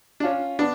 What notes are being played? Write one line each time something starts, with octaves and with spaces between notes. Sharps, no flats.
D4
C#4 F4
B3 D4